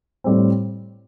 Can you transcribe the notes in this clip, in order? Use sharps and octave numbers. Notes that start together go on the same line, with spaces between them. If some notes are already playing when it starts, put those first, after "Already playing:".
A2 G3 C4